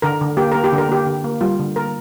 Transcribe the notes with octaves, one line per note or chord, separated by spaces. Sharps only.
D3 A#4
D3
A#3 G4
A#3 A#4
G4
D3
A#4
A#3 G4
D3
A#3
G3 F4
D3
A#3 A#4